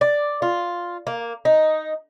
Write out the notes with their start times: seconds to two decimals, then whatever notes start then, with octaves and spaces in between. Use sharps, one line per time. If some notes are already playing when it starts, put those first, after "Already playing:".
0.01 D5
0.42 F4
1.07 A#3
1.45 D#4